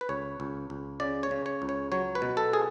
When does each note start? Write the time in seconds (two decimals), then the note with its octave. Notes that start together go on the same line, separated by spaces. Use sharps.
0.01 B4
0.09 C#2 C#5
0.40 C#2
0.70 C#2
1.00 C#3 D5
1.23 C#5
1.31 C#3
1.46 C#5
1.62 C#2
1.69 C#5
1.92 F#3 C#5
2.15 B4
2.22 B2
2.37 A4
2.53 G#4